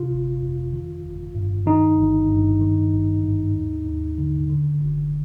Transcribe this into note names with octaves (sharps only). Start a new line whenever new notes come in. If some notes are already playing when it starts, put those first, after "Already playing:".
Already playing: C3 F4
G1
F2
D#3
G1
G2
D#3 D#4
G1
G2
D#3
G#1
G#2
D#2
D#2
D3
D3
G1